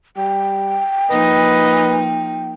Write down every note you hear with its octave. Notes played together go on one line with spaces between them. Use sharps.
G3 G5
F3 A#3 D#4 B4 D#5